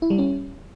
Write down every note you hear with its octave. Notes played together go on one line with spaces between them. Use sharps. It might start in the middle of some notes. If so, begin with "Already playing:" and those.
E4
G3
C#4